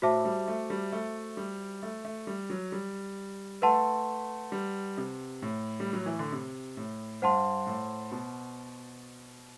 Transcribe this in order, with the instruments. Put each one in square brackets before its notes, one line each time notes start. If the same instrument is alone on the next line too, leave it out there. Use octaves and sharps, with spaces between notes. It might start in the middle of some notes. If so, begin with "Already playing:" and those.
[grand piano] A2 [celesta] F#4 C5 E5 A5 D6
[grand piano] G3
A3
G3
A3
G3
A3
A3
G3
F#3
G3
[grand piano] A3 [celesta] B4 F#5 A5 C6
[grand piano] G3
C3
A2
G3
F#3
E3
D3
C3
A2
[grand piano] G2 [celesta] C5 F#5 A5 C6
[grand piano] A2
B2